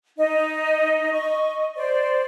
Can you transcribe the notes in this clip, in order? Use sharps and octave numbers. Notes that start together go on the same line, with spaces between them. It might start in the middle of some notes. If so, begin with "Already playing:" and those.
D#4 D#5
D#5 C#6
C5 D5